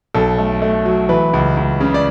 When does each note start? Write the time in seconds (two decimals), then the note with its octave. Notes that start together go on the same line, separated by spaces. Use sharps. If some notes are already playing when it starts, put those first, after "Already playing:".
0.14 B1 A4
0.38 A3
0.62 A3
0.85 F#3
1.09 E3 B4
1.33 C#2
1.57 C#2
1.80 C#3
1.94 D5